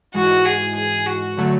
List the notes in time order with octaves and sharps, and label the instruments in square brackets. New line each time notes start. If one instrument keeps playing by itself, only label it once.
[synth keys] G#2 E3 G#3 [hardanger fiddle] F#4
[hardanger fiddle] G#4
G#4
F#4
[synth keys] D3 F#3 A3